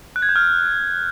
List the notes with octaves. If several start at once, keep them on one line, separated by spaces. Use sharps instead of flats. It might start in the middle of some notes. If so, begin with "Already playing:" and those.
F#6
G#6
G6
F6